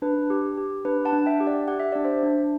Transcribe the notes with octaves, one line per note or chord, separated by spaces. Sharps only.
D4 B4
G4
G4
D4 B4
F#5 A5
D4
E5 G5
G4
D5 F#5
G4 F#5
E5
D4 D5
C5 E5
D4